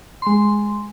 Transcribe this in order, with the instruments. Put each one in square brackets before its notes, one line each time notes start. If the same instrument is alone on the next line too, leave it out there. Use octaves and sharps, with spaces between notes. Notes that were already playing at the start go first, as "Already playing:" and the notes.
[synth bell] G#3 C6